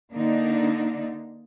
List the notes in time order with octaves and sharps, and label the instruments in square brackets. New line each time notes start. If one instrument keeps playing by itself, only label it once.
[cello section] D3 A#3 D4 D#4